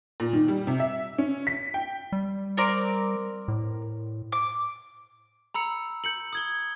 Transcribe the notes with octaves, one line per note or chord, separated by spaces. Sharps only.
A#2
D#3
G3
C3
E5
C#4
B6
G5
G3
C4 A#4 D5
A2
D6
A#5 B5 E6 C#7
G6 C#7 F#7
D#6 G#6 G7